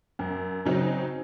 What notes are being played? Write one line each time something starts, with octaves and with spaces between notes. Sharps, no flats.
F#2
C#3 F#3 C4 D#4